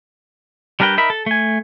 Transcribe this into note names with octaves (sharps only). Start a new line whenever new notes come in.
G3 D4 A#4 B4 G5
D#4 A#4 E5 B5
A4
A3 G#5